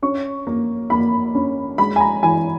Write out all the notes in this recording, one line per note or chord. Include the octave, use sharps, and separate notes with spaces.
C#4 C#6
A#3
A#3 B5
C#4
G#3 B5
G#5
A#5
E3 G#5